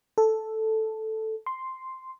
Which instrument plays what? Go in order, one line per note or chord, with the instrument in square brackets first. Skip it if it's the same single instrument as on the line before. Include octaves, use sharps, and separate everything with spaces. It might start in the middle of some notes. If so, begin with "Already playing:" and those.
[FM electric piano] A4
C6